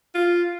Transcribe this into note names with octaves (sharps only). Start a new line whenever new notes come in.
F4